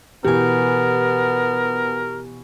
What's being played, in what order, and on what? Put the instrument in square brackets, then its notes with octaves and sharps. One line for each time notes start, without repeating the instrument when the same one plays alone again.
[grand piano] B2 E3 [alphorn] B3 [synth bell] G4 G#5 [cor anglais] A#4